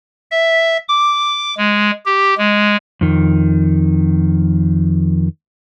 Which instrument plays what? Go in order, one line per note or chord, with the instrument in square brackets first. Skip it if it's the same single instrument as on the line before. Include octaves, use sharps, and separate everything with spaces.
[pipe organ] E5
D6
G#3
G4
G#3
[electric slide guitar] F2 D#3